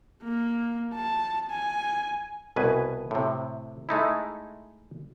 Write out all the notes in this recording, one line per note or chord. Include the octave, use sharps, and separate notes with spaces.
A#3
A5
G#5
C2 B2 B4 G#5
A2 C3
G#3 A3 D#4 E4